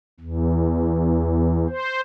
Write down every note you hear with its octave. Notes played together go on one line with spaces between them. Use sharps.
E2
C5